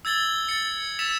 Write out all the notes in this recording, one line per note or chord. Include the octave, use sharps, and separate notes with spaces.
E6 G#6 A6 F#7 G7
A6 C#7
E6 A6 B6 E7 F7